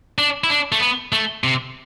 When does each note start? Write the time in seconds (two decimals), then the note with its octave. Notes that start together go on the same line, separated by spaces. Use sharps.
0.18 D4
0.44 E4
0.49 D4
0.72 A3
0.80 B3
1.13 A3
1.44 C3